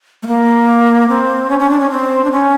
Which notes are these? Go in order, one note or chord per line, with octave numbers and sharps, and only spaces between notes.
A3
A#3
C4
C#4
C#4
D4
C#4
C4
D4
C#4